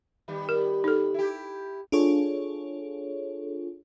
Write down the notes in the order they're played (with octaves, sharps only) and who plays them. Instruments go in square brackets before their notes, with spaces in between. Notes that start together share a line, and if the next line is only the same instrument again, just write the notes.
[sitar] D#3 G3 B3
[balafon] A#4
D#4 A4
[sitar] E4 G4
[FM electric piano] D4 F4 G#4 A4 C#5